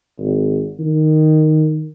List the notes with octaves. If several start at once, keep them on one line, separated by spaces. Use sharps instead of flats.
G#1
D#3